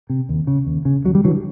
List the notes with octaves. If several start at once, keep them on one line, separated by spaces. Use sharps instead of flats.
C3
D#2
C#3
D#2
C#3
D#2 F#3
G3
D3 E3 F#3